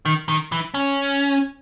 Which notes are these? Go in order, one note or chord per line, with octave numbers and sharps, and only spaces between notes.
D#3
D#3
E3
C#4